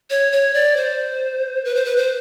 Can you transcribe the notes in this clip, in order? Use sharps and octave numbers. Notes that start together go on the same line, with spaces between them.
C#5
C#5
D5
C5
B4
C5
B4
C5